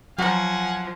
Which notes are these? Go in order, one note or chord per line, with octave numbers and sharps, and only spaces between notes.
F3 F#3 F#4 F#5 G#5 A#5